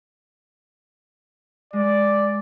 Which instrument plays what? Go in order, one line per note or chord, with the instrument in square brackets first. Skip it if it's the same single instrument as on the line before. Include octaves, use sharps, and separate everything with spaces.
[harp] G#3 [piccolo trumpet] D5